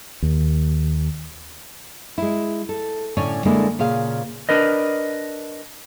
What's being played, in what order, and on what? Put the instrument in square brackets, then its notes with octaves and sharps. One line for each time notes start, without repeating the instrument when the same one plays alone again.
[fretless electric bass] D#2
[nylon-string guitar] G#3 E4
A4
A2 D3 C#4 C#5 D5 G#5
D3 G#3 A#3 D4 E4 A4
A#2 C#3 G#4 F5
[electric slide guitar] D4 A#4 B4 D#5